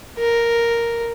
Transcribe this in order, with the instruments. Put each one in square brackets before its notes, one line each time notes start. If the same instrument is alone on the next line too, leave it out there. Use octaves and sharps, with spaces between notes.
[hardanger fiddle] A#4